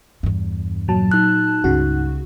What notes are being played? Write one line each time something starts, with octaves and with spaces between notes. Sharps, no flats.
E2 G2
A#2 F#3 A5
D#4 F#6
C#2 G2 C#3 F#4